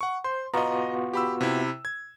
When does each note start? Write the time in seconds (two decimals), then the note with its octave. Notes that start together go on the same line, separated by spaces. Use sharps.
0.01 F#5 C#6
0.24 C5 C6
0.54 B3 F4 F#4 D#5 A#5
1.13 G4 B5 E6
1.41 C3 E4
1.85 G#6